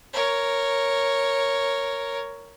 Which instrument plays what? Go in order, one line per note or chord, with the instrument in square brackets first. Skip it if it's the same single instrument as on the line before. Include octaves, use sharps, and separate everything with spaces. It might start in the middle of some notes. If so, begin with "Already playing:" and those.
[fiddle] A#4 C#5